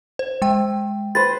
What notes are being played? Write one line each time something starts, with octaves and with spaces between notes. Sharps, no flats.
C5
G#3 G5
B4 C5 A6